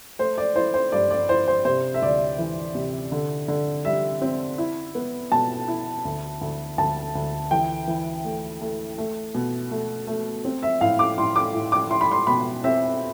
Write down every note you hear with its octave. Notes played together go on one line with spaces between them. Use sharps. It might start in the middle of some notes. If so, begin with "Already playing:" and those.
A3 C5
D5
E4 C5
C5
G2 D5
D5
E4 C5
C5
C3 C5
E5
D2 D5
E3
C3
D3
D3
G3 E5
C4
E4
B3
B2 A5
E4
D2
D2
D2 A5
D2
E3 G5
E3
A3
A3
A3
B2
A3
A3
C4
E5
A2 F5
D6
A2 C6
D6
A2
D6
E4 C6
B5
C6
B2 B5
C4 E5